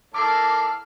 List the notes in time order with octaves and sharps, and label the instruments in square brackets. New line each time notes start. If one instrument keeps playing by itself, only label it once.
[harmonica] A#3 E4 D5 [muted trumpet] A4 [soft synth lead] D6 [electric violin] F6 C7